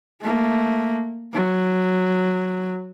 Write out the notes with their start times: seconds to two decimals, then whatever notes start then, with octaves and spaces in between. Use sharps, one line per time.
0.21 A3 A#3
1.34 F#3